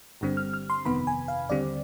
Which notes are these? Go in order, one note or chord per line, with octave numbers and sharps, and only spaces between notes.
G1 G2 D3 G3 C4
F6
F6
C6
G1 F2 C3 D#3 B3 B5
G#5
F5
D#2 D3 G3 C4 D5